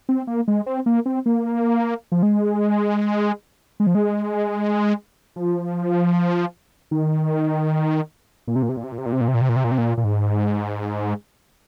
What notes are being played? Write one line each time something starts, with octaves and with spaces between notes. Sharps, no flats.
C4
A#3
G#3
C4
A#3
C4
A#3
F3
G#3
G#3
F3
G#3
F3
D#3
A#2
C3
A#2
C3
A#2
C3
A#2
C3
A#2
C3
A#2
C3
A#2
C3
A#2
C3
A#2
C3
A#2
A#2
G#2